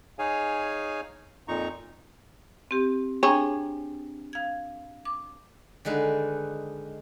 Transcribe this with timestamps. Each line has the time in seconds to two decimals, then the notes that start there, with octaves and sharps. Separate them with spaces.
0.19 D#4 G#4 C#5 F5 G#5
1.48 F2 A#2 D#4 A#5 C#6
2.71 C4 G4
3.23 C4 D4 G#4 C#5 G5 A#5
4.33 F5 G#6
5.05 D6
5.85 D3 D#3 G#3 D#4 B4